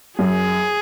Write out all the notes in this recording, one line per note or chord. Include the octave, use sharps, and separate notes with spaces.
F#2 G#4